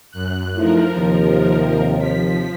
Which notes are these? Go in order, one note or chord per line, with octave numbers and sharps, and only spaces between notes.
F#2 F#6
F3 A3 D#4 E4 A#4
D#2 C3
F3 B6